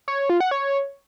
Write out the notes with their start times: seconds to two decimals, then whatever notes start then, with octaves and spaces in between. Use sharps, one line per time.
0.08 C#5
0.19 C#5
0.30 F4
0.40 F#5
0.51 C#5